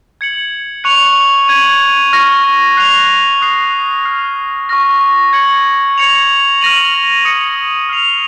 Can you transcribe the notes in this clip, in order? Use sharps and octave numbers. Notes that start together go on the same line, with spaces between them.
G#6 C#7 F#7
C#6 F#6 C#7 F7
G#6 D#7 F#7
C#6 F6 A#6 C#7
F#6 C7 F7
D#6 F#6 C7 F7
F6 C7 F7
C#6 F6 A#6
G#6 C#7 F#7
G#6 C#7 F7
F6 A#6 D#7 F#7
D#6 A#6 C#7 F7
F6 C7 F7